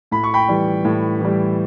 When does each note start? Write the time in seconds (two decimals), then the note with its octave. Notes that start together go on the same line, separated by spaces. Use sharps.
0.11 A2 B5
0.24 C#6
0.34 G5 B5
0.49 E3 G3
0.85 A2
1.20 E3 G3